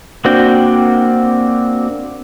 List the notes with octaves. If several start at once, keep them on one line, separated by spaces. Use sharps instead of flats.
A#3 C4 D4 F#4 G5